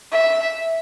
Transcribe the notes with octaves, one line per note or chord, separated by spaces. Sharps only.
E5